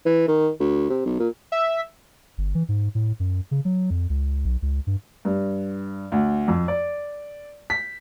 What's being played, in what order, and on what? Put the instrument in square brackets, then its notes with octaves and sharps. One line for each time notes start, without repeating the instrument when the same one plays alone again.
[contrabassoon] E3
D#3
D2
C3
B1
A#2
[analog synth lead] E5
[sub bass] G1
E3
G#2
A2
F#2
C#3
F#3
F2
C#2
B1
C#2
G2
[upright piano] G2
D2
F2
D5
B6